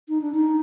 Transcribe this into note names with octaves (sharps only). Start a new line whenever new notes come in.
D#4
D4
D#4